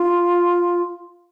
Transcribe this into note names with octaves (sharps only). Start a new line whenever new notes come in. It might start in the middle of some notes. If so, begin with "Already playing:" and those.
Already playing: F4